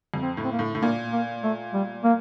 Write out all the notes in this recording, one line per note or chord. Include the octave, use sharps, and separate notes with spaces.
F2
C4
A2
C4
A#3
A2
A2
A#2 A#3
A#3
A3
G3
A#3